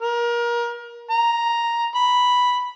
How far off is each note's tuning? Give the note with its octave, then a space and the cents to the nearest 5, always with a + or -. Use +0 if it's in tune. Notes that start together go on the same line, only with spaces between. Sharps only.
A#4 +30
A#5 +5
B5 +0